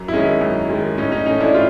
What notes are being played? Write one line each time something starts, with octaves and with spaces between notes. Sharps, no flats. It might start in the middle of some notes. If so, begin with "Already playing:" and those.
Already playing: F#2
E4
D#3 G#3 C#4 D#4
F#2
D#3 G#3
A2 C#4 D#4
C#4 D#4
E3 A3 C#4 D#4
D4 E4
A2 F4